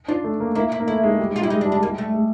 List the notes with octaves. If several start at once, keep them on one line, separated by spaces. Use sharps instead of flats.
D4 F4
A3
A#3
A#3 E4
E4
A#3
A3 E4
G#3
G3
G#3
F4
G3 E4
D#4
G#3
D4
G3
D4
G#3
A#3
G3
A3
G#3